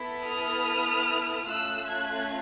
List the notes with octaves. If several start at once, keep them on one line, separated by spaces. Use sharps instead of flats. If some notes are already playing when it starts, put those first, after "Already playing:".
Already playing: B3 E4 A4
D#6 F6
A3 C#4 F4 A4 E6 F#6
F#6 G#6